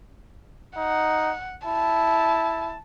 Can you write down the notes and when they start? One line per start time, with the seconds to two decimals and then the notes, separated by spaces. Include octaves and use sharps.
0.77 D#4 F#5
1.66 E4 A5